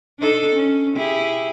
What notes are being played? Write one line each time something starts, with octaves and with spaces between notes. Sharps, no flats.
D4 D#4 A4
C#4
E4 G4 G#4